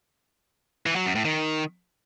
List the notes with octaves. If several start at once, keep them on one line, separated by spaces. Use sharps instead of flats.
E3
F#3
F#2
A2
D#3